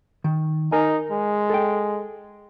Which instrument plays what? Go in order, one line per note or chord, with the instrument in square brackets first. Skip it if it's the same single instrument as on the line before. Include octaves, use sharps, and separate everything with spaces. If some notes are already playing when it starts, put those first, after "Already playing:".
[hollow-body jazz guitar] D#3
[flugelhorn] D#4 [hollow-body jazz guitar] A#4 G#5
[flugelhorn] G#3
[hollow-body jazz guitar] A4 G5